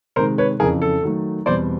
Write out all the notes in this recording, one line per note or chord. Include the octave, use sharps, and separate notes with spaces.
C3 D#3 G#3 A#4 C5
B4 C#5
F2 C#3 E3 G#4 A#4
A4
D#3 F#3 A3
E2 B2 G3 C4 C5 D5